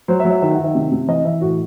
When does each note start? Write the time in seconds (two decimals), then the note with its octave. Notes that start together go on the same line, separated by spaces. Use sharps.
0.08 F#3 C5
0.20 E5
0.25 F#3
0.31 E5
0.42 D#3 E5
0.53 F#5
0.58 D#3
0.64 E5
0.75 C3
0.92 C3
1.08 E3 D#5
1.25 E3 E5
1.41 A2 F#4